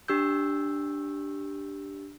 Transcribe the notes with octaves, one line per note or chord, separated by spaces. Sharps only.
D4 G4 E6 G6